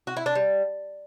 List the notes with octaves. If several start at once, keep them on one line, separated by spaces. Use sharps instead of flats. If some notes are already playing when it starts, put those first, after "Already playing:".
F#4
E4
D4
G3